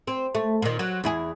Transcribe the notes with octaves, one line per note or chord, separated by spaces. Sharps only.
C4
A3
A#2 D#3
F#3
E2 E4 G#4